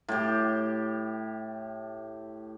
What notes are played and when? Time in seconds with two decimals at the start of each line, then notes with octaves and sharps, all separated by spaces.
0.08 A2 G4